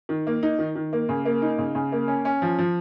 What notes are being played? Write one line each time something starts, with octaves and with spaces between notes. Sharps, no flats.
D#3
A#3
D#4
D#3
D#3
A#3
C#3
A#3
D#4
C#3
C#3
A#3
C#4
C#4
F3
F3